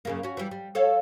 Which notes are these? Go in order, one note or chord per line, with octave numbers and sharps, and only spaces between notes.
F#2 C#3 A#3
C#4 F#4
E3 G3
G3
A4 C#5 F5